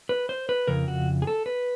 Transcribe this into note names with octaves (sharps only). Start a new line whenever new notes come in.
B4
C5
B4
F2 C#3 A#4
F#4
G#4
A4
B4